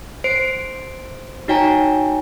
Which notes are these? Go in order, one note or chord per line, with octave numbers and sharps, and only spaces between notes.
C5 C7 D7
D#4 F#4 C#5 G5 G#5 A#5